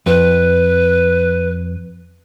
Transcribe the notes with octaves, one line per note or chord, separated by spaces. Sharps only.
F2 B4